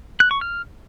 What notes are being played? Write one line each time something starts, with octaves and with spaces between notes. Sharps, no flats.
F#6
C#6
F6